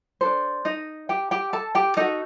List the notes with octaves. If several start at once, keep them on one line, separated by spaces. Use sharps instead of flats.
D4 A4 C5
D#4 D#5
G4 G5
G4 G5
A4 A5
G4 G5
D#4 F#4 A4 D#5